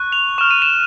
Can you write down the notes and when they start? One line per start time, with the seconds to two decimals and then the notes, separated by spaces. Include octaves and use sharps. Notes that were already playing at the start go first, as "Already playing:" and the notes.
Already playing: C#6 F#6
0.12 F7
0.38 C#6 F6 E7
0.51 D#7
0.62 E7